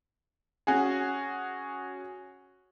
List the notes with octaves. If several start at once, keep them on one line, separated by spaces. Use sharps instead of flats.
C#4 F#4 G#4